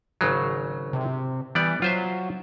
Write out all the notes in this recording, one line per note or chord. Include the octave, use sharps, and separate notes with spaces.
G#1 C#3 F#3
C3
E3 G3 B3 D5
F#3 F4 C5 E5